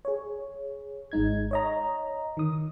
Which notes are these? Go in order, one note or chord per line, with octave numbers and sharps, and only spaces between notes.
G#4 C#5
G#1 G#3 D#4 G#6
C#5 D#5 A#5
D#3 D#6